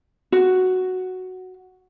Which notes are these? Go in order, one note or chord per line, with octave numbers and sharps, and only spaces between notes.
F#4